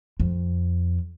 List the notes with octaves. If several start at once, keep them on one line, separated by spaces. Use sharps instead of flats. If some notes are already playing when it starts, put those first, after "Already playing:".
F2